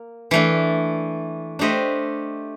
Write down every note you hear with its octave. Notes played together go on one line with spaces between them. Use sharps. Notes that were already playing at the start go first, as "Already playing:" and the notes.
Already playing: A#3
E3 A3 D4
A3 D4 G4 C5 D#5